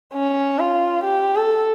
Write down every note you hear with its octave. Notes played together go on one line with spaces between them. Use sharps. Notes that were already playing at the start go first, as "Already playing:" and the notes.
C#4
F4
G4
A4